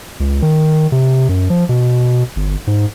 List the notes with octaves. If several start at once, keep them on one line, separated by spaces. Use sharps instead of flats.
C#2
D#3
C3
F#2
F3
B2
G1
G#2